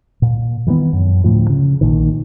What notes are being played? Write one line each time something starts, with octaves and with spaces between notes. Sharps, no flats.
A#2
D#3 E3 G3 B3
F#2
D2 A2 F3
C#3
A#1 A#2 D#3